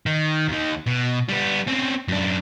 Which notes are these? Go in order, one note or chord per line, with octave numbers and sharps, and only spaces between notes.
D#3
D#2 D#3
B2
G3 B3
C4 C#4
F#2 D4